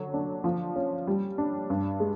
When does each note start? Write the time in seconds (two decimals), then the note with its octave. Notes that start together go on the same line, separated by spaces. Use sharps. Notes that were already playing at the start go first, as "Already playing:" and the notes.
Already playing: D3 F#3
0.14 D4
0.44 F3
0.76 C#4
1.07 G3
1.38 D4
1.70 G2
2.00 G#3